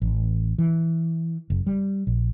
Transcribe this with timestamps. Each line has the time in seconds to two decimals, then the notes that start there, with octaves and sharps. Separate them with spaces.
0.02 A1
0.58 E3
1.50 F#1
1.67 G3
2.07 A#1